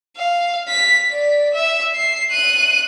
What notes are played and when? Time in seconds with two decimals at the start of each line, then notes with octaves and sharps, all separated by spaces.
0.17 F5
0.68 B6
1.12 D5
1.54 E5
1.95 C7
2.31 F#6 D#7